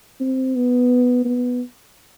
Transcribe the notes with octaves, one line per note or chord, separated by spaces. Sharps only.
C4
B3
B3